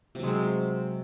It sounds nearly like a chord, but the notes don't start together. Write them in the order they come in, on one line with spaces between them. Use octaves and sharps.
C3 F#3 G#3 C4